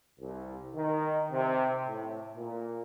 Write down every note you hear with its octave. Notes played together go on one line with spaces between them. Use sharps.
C2
D#3
C3
A2
A#2